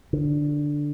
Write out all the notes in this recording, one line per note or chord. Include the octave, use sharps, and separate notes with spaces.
D3